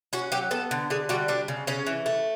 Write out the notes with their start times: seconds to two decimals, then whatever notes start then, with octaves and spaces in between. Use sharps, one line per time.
0.13 C#4 F#4
0.32 F#3 G4
0.51 B3 A4
0.71 D3
0.90 D3 G#4
1.09 G3 F#4
1.28 G3 D4
1.48 C#3
1.67 C#3 C#4
1.87 E3
2.06 A3